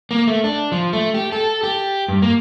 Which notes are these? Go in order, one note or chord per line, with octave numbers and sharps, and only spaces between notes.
A#3
A3
D4
F3
A3
G4
A4
G4
G2
A#3